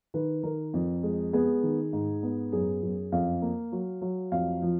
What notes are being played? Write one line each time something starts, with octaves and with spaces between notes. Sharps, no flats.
D#3 B4
D#3 A#4
F2
G#3
B3 G#4
D#3
G#2
B3
F#2 G#4
F#2
F2 F5
A#3
F#3
F#3
F2 F5
F3